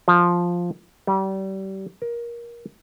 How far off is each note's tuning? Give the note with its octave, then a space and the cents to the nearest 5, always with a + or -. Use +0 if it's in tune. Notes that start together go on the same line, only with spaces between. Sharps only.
F3 +5
G3 -30
A#4 +20